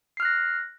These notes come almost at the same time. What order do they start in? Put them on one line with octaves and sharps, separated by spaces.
C7 F6 F#6 A#6